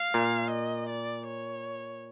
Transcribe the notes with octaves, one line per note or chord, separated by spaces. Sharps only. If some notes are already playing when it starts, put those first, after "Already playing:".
Already playing: F5
A#2
D#5
D5
C#5